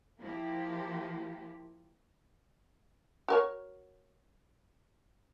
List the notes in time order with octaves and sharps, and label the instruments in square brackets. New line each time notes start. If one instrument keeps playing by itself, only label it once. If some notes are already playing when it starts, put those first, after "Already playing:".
[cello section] F3 A#3 E4 F4 G4
[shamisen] F#4 A#4 C#5